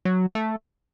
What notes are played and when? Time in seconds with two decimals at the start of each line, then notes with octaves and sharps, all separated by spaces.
0.05 F#3
0.35 A3